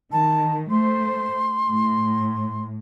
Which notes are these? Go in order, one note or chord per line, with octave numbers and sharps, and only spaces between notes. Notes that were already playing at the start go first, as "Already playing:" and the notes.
D#3 A5
A3 C5 C6
A2